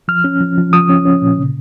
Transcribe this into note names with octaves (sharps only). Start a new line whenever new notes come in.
F3 F6
C#4
F3
F3
F3 D#6
C#4
C#4
A#2
C#3